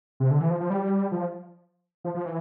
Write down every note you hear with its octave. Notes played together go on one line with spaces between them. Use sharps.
C3
D3
E3
F3
F3
G3
F3
F3
F3
E3